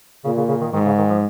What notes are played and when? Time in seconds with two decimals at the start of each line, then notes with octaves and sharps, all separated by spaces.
0.25 A#2 C#3
0.37 C#3
0.48 C#3
0.61 D#3
0.73 G#2 D#3
0.86 C#3
0.98 D#3
1.09 F3